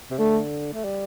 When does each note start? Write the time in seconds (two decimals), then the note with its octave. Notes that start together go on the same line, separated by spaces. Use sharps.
0.11 C3
0.18 D3 A3
0.73 A3
0.84 G3